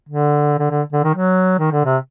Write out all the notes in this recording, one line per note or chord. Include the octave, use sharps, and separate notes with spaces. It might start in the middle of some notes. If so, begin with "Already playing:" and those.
D3
D3
D3
D3
D#3
F#3
D#3
D3
C3